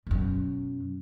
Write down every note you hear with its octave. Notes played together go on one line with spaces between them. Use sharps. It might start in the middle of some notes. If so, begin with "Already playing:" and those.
F#2 B2